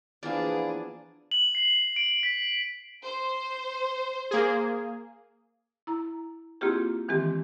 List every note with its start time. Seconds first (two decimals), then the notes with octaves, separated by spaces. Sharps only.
0.23 E3 F3 A#3 B3 D4 G#4 D5 F5
1.31 F#7
1.55 C7
1.96 D7
2.23 B6
3.03 C5
4.31 A#3 G#4
5.87 E4 A#5
6.61 A#3 C4 E4 F4 G4 G#4
7.08 D#3 E3 G#3 C4 G4